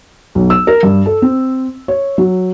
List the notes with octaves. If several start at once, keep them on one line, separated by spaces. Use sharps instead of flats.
B1
E6
A#4
G2
A4
C4
C#5
F#3